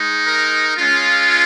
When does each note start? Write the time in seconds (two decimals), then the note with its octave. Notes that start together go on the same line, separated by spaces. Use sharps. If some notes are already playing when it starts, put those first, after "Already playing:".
Already playing: G#3 D#4
0.27 A#4
0.77 G#3 C#4 F4